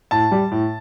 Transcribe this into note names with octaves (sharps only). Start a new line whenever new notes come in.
A2 A5
G3
A2